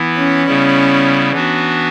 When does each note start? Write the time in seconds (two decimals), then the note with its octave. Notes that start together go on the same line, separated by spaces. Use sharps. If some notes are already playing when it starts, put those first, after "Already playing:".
Already playing: E3 B3 E4
0.18 C#4
0.46 C#3 G3 B3 E4
1.32 E3 B3 D4 F#4